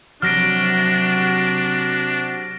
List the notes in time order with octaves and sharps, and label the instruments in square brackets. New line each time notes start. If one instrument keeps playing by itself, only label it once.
[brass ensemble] C3 F#4 [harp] F#3 [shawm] D4 [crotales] F6 A#6 D7